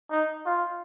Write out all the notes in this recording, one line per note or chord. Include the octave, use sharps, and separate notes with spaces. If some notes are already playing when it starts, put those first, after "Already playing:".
D#4
F4